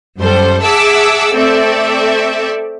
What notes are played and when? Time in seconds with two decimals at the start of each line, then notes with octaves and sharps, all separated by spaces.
0.19 F#2 G3 A4 C5
0.62 G#4 E5 F#5 A5 D6 E6
1.34 A3 C4 A4 D5 E5